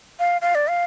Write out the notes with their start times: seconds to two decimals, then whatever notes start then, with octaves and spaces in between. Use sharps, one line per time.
0.19 F5
0.42 F5
0.55 D5
0.69 F5